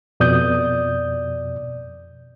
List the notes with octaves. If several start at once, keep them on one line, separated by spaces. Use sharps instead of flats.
F2 B2 D5 D#6 G6